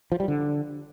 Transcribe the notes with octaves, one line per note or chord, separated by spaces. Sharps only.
F3
G3
D3